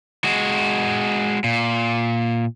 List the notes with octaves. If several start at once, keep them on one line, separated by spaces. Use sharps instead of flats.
G#3 F#4
A#2